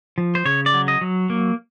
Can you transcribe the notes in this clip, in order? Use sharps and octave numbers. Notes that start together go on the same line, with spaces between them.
F3
C5
C#3 C#5
D5
F#3
D#5
F#3
A#3